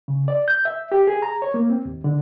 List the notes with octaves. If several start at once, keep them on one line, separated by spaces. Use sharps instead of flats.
C#3
D5
G6
E5
G4
G#4
A#5
C#5
A#3
C4
D#2
D3